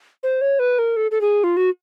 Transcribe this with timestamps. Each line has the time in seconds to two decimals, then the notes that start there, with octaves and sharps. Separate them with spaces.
0.23 C5
0.41 C#5
0.59 B4
0.79 A#4
0.96 A4
1.11 A4
1.21 G#4
1.44 F4
1.57 F#4